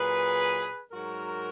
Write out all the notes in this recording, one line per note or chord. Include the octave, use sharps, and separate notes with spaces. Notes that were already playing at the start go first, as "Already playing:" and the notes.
Already playing: A#2 F#3 G#4 B4
G#2 F#3 F#4 A#4